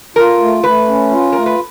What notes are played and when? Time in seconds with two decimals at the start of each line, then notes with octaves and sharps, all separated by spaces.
0.16 F4 A#4
0.40 A3
0.64 A3 B4
0.87 C#4
1.11 F4
1.33 A3 A#4
1.46 B4